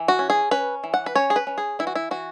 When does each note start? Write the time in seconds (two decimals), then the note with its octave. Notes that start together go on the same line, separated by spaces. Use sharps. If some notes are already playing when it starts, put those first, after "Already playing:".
Already playing: E3
0.08 F#4
0.19 C#4
0.30 G#4
0.51 C#4 B4
0.84 E3
0.94 F#5
1.06 B4
1.15 C#4 C#5
1.30 G#4
1.36 B4
1.47 C#4
1.58 G#4
1.79 E3 E4
1.87 F#4
1.96 E4
2.11 E3 F#4